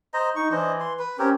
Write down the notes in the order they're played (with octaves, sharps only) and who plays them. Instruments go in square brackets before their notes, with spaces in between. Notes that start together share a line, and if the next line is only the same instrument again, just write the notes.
[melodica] C5 D#5 A#5
[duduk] D#4 [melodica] C#6
[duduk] E3 [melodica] D4 C5 D#5
[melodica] C6
B4
[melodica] C4 G4 A#4 [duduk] C#4